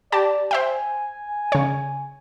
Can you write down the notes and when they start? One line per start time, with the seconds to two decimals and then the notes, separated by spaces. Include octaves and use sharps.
0.12 G4 D5 A5
0.51 C5 E5 G5 G#5
1.52 C#3 C#5